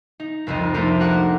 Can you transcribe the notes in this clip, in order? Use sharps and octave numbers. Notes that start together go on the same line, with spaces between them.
D#4
F1 C2 F2 A#4 D#5
A3 A#3 C4 D4 D#4 F4
F#4 A#4 F#5 D6